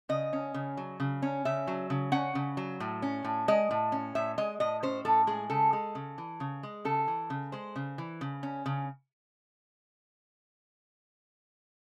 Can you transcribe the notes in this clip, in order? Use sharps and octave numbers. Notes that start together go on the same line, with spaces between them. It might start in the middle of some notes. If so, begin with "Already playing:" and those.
C#3 D#5
C#4
C#3
F#3
C#3
C#4
C#3 E5
F#3
C#3
C#4 F#5
C#3
F#3
A2
C#4
A2
G#3 D#5
A2
C#4
A2 E5
G#3 D#5
A2 D#5
C#4 C5
A2 A4
G#3 G#4
C#3 A4
G#3
C#3
E3
C#3
G#3
C#3 A4
E3
C#3
G#3 C5
C#3
E3
C#3
C#4
C#3